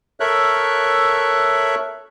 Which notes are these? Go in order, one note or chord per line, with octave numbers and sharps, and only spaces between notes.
A4 A#4 C#5 E5 F#6